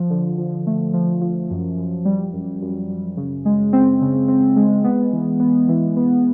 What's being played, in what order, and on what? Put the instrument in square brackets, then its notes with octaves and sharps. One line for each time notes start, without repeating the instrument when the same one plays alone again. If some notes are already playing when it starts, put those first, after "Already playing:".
Already playing: [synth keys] F3
D3
F3
A3
F3
F3
F#2
F#2
G3
F#2
F#2
F#2
C#3
G#3
C4
C#3
C4
G#3
B3
E3
B3
E3
B3